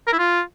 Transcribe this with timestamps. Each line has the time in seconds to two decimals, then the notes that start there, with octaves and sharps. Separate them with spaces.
0.07 A#4
0.13 E4
0.19 F4